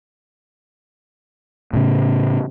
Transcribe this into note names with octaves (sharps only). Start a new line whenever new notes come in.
A2 C#3